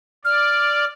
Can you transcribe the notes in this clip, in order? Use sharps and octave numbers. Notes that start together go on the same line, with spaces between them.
D5 F6